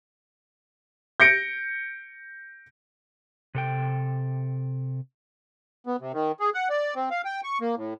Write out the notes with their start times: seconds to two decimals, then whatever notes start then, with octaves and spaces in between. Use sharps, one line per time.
1.20 G6 A#6 C#7 D7
3.55 C3 A4 G5
5.86 B3
6.00 C3
6.13 D#3
6.40 G#4
6.54 F#5
6.70 D5
6.95 C4
7.11 F5
7.25 G5
7.44 C#6
7.61 A#3
7.77 A2